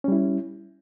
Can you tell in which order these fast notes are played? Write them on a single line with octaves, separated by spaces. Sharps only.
C#4 G3 E4